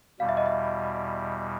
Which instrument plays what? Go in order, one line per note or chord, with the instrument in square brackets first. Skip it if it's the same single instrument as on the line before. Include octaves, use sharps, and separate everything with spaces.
[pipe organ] E2 B2 G3 [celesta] F5
[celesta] E5
D#5
E5